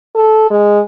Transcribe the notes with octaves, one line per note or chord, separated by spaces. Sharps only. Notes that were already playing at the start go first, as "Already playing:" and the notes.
A4
G#3